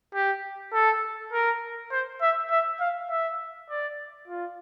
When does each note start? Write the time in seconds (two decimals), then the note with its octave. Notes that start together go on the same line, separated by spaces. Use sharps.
0.14 G4
0.73 A4
1.32 A#4
1.92 C5
2.21 E5
2.51 E5
2.80 F5
3.10 E5
3.69 D5
4.28 F4